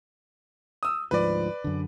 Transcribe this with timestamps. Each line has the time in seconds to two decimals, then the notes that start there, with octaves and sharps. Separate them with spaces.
0.83 D#6 E6
1.11 D2 G#2 F3 B4 D5
1.64 F#2 D3